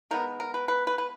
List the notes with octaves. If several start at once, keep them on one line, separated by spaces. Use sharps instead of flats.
D#3 G#3 B3 A#4
A#4
B4
B4
B4
B4